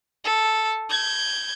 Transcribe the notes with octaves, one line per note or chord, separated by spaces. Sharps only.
A4
G6 G#6